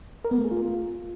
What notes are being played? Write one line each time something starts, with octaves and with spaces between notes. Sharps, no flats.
A#4
B3
A3
G#4
F4